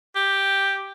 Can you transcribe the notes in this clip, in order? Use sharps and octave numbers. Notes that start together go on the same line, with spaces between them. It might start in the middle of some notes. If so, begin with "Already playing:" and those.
G4